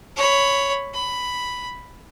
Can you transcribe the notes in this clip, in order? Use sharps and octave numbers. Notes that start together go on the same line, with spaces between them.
C#5 B5
B5